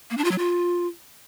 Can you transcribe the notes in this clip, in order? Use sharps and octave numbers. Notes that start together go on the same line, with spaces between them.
A#3
D4
F4
F#3
F4